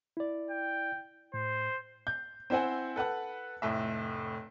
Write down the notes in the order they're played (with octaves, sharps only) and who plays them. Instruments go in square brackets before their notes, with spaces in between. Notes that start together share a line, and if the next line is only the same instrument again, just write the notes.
[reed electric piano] E4 D5
[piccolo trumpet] G5
[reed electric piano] A2 [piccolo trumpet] C5
[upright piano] G6
C4 E4 C5 F#5 G#5
A4 B4 F#5 F#6
F1 A2 E5